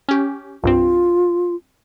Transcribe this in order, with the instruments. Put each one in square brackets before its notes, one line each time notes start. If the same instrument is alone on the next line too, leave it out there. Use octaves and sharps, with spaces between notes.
[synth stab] C#4 G4
[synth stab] C2 G2 C4 [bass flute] F4